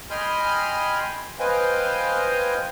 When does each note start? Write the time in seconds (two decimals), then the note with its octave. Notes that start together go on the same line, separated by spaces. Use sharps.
0.10 D#5 G5 G#5 B5 C6 F6
1.40 B4 C5 D#5 F5 G5 G#5